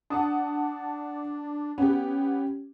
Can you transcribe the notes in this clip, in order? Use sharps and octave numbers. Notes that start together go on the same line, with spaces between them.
D4 F#5 A5 D#6
B3 C#4 G4